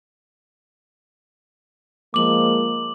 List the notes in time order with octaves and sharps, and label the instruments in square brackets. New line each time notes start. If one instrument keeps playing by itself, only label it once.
[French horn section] F3 G#3 A#3 [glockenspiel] D6 F#7